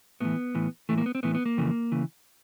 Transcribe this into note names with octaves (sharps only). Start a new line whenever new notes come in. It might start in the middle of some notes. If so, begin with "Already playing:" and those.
A2 E3 B3
A2 E3
A2 E3 A3
A#3
B3
C4
A2 E3 B3
B3
A#3
F2 C#3 E3
C#3 E3